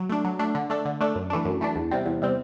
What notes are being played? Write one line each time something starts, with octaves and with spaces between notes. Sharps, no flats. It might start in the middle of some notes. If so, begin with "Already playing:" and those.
Already playing: F#3
A3 D4
F#3
A3 D4
D3
A3 D4 A4
D3
A3 D4 A4
F#2
E3 A3 D4
F#2
E3 A3 D4
E2
C3 G3 C4
E2
C3 G3 C4